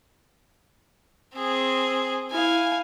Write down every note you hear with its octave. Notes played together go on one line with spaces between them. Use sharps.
C4 G#4
E4 F5 G#5